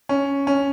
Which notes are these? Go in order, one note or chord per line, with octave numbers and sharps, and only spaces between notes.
C#4
C#4